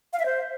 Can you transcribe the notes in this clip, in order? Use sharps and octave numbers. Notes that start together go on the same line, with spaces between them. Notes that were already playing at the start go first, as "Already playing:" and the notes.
F5
E5
C5